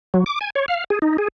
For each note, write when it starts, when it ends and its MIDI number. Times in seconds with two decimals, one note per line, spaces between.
0.14 0.24 54
0.26 0.39 86
0.41 0.50 80
0.55 0.66 73
0.68 0.84 77
0.90 0.99 68
1.02 1.17 63
1.18 1.28 68